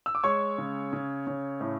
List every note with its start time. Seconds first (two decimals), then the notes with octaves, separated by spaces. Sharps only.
0.06 E6
0.15 D6
0.23 G#3 C#5 C#6
0.58 C#3
0.93 C#3
1.27 C#3
1.61 A2